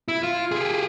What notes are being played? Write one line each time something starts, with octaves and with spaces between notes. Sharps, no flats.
E4
F4
G4 G#4